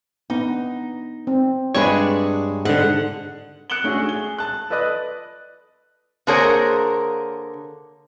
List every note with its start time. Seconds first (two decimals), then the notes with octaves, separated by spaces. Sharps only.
0.30 B3 D4 D#4
1.27 C4
1.75 G2 G#3 D4 B4 C#5 C#6
2.65 G#2 D3 F#5
3.70 F#6 C#7 D7 E7 F#7 G7
3.84 A3 C#4 D4 F#4 G#4
4.06 G#4 G7
4.38 A5 F#6
4.70 A4 B4 D5 D#5 D#6 F#6
6.27 D3 A#3 G#4 A#4 C5 C#5